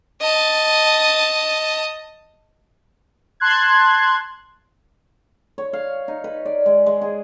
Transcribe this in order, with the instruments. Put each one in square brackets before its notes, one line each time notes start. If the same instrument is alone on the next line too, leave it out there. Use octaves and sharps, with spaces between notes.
[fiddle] D#5 A5
[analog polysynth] A5 C6 F#6 G#6
[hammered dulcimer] C#5
F5
D#4
B4
D5
G#3
G#3
G#4